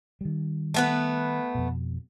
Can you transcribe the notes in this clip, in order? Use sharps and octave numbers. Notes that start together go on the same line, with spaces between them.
D#3 G3
A3 B3 B4
F2 B2